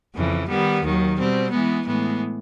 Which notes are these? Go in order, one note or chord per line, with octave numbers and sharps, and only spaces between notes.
F2 C#3 E3
D#3 G3 B3
D#2 D#3 F#3
B2 G3 C4
E3 G#3 B3
A2 E3 G#3 B3